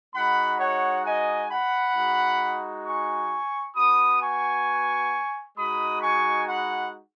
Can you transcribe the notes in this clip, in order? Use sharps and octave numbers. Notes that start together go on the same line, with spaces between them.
G#3 D#4 F#4 F#5 B5
C#5 F#5
D#5 G#5
F#5 B5
G#3 D#4 F#4
G#5 C#6
B3 F#4 B5 D#6
G#5 C#6
G#3 D#4 F#4 B5 D#6
G#5 C#6
F#5 B5